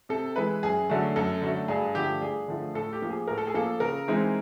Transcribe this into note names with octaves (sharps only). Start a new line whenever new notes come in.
C3 A4
E3 G#3 B4
F#2 G#4
D3 F#3 A3
F#2 A4
D3 F#3 A3
G2 G#4
D3 F3 A3 G4
G2 G#4
D3 F3 A3
A2 A4
G4
F3 A#3
G#4
A2 A#4
A4
G#4
F3 A#3 A4
C#3 A#4
E3 G#3 C4 D#4